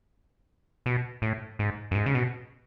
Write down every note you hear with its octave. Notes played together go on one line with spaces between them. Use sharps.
B2
A2
G#2
F#2
G#2
C#3
B2